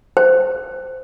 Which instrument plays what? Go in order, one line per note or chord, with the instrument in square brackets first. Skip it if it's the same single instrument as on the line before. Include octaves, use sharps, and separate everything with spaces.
[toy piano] C5